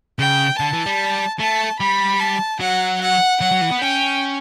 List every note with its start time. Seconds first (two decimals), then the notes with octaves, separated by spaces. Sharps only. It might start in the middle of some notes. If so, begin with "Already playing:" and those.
0.19 C#3 G5
0.60 D3 A5
0.73 E3
0.86 G3
1.39 A3 A5
1.80 G3 B5
2.20 A5
2.60 F#3 F#5
3.02 F#5
3.41 F#3 F#5
3.51 F#3
3.61 E3
3.71 B3
3.81 C#4 G5